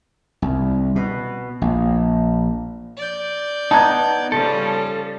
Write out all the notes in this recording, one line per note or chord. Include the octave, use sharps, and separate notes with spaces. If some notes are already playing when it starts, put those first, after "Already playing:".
C2
B2
A#1
D5 G6
B3 D#4 A5 A#5 G#6
C#3 F3 G3 A4